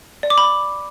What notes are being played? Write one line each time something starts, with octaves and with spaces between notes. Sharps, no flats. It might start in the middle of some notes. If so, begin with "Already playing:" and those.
D5
D6
B5